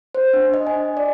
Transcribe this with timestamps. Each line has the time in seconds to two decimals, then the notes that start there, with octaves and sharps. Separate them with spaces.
0.15 C5
0.33 D4
0.54 D#5
0.67 G#5
0.97 D5